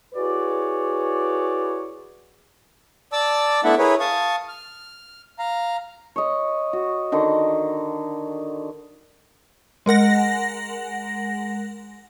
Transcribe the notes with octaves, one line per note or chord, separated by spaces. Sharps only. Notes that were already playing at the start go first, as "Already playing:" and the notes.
E4 F#4 G#4 B4 C#5 D5
D5 A5 D6 E6
A3 B3 D4 E4 E5 F#5
E4 G#4 A#4 B4 C#5
F5 A5 C#6 D#6
F6
F5 A#5
C#5 D#5
F#4
D3 D#3 D#5
G#3 A#4 F#5 A#6